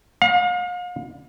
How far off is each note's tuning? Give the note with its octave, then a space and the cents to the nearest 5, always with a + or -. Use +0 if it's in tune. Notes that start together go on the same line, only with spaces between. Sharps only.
F5 +40